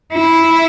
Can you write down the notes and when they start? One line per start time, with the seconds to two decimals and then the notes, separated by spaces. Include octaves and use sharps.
0.13 E4